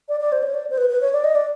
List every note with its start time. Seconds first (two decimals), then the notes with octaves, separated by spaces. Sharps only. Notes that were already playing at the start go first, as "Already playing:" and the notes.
0.09 D5
0.20 D5
0.32 C5
0.43 C#5
0.54 D5
0.70 C5
0.78 B4
0.89 B4
1.01 C#5
1.13 D5
1.24 D#5
1.35 D5